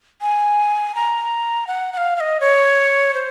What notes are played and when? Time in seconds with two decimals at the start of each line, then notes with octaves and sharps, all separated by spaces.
0.21 G#5
0.95 A#5
1.67 F#5
1.93 F#5
1.97 F5
2.16 F5
2.20 D#5
2.40 C#5
3.14 C5